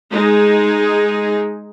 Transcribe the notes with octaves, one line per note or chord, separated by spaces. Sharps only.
G#3 D#4 G#4